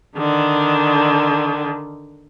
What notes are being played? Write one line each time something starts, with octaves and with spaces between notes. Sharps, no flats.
D3 D#3